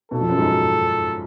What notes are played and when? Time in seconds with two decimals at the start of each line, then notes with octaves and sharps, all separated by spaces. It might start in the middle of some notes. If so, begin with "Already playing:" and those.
0.11 B1 B2 A4
0.21 F2 F3
0.29 F#2 F#3
0.38 G#2 G#3
0.47 F#3